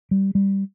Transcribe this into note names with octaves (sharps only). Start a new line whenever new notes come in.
G3
G3